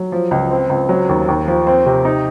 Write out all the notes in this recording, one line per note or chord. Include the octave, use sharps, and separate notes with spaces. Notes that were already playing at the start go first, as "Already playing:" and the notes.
Already playing: F#3
F3
C#2
C4
C#2
F#3
D#2
D#2
F3
C4
C3
D#4